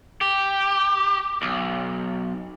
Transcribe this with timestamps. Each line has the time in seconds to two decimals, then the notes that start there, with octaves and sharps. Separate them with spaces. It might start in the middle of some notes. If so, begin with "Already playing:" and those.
0.21 G4
1.42 B1